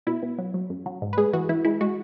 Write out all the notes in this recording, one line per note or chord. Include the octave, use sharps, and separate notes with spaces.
B2 E4
B2
F#3
F#3
F#2
F#3
G#2
B4
G#3 G#4
E3 F#4
E3 E4
G#3 E4
G#3 F#4